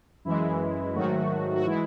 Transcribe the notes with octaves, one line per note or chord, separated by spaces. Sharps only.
F#2 E3 G#3 E4
G#2 D#3 F#3 A3 F#4
F#4
E3 G#3 E4